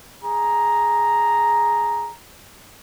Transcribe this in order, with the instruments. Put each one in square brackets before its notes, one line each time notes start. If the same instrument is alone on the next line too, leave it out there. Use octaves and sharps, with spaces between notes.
[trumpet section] G#4 A#5